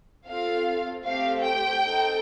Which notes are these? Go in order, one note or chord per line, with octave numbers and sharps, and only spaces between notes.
C4 F4 A4 F5
A3 C4 G4 F5
G5
C4 D#4 A4